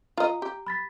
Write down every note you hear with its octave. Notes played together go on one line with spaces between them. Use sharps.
F4 D#5 A#5
G4
B5 A6 B6